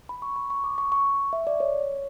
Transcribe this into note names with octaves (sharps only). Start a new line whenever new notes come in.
B5
C#6
B5
C#6
D6
C#6
C#6
E5
D5
C#5